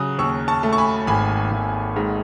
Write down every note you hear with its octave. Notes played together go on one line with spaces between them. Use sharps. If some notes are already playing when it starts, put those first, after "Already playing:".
Already playing: C#3 F#3 D#6 F#6
D#2 C#6 E6
A5 C#6
A3
C#6
G#5 B5
G#1 G#5 B5
G#1
G#2